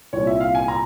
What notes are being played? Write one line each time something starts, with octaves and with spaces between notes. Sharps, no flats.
C2 A#2 C#5
E5
F5
G#5
A#5